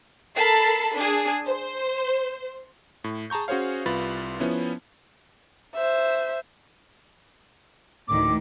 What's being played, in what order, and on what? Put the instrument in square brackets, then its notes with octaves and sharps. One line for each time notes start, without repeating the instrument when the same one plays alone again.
[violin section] A4 A#4 A5 B5 C7
D4 G#4
C5
[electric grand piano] A2
G#4 A5 A#5 C#6 G6
C#4 F#4 G#4 C5 C#5 F5
C2 F4 B4 B5 A6
F3 B3 C#4 E4
[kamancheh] C5 E5
[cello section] D2 A2 D#3 [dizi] D6